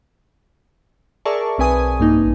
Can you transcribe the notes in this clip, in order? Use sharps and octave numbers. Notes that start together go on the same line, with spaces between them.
G#4 A#4 D5 E5 A5 C#6
B1 C4 B4 G#5 D#6
G2 A#3 D#4
A1